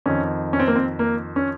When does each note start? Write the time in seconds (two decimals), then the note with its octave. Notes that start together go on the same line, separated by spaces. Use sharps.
0.06 F2 D#3 C#4
0.53 C#4
0.59 C4
0.68 A#3
0.75 C4
0.99 A#3
1.36 C#4